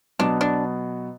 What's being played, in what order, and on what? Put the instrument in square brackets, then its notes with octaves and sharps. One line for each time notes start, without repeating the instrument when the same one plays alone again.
[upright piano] B2 F#3 B3 [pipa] D4
[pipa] D4